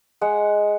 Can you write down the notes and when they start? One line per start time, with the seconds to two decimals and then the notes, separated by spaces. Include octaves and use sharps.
0.21 G#3 F#5